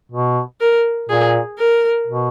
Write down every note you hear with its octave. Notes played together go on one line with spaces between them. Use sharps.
B2
A#4
A#2 G#4
A#4
B2